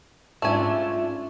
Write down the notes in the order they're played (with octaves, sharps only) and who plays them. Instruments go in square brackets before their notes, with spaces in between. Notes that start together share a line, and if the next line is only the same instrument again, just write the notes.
[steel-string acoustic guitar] G#2 C#4 F4 [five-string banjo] A3 G#5 [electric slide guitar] D4 E5